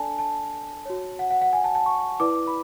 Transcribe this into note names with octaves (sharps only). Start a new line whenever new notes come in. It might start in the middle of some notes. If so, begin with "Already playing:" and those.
Already playing: D4 A4 D5 G#5 A5
A5
F#4 C#5
F#5
F#5
F#5
G#5
A5
A5
C#6
E4 B4 D5 D6
B5